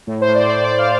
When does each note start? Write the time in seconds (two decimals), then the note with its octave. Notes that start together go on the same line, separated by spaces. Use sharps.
0.07 A2
0.21 C5
0.28 A2
0.35 D5
0.49 A2 D5
0.64 D5
0.70 A2
0.78 F5